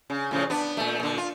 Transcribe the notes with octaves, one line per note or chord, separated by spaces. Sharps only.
C#3
A2 C#3 F3
B3 D4
A#2 A3
A#2 D3
F4